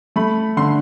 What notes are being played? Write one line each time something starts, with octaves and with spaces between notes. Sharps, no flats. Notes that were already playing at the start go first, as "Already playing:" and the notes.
A3 B5
D3 C6